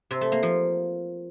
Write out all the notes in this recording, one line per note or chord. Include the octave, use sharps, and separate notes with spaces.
C3
A3
A#3
F3